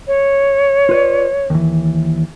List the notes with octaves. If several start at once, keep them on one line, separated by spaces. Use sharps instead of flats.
C#5
F4 B4 D5
D#2 E3